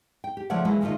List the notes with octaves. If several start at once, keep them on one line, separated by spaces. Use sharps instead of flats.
G5
G4
C#3 F3 A3 C#5 D5 F#5
E3 F#3 G#3 A#3 E4
D2 G#2 D#3 A#3 F4 D#5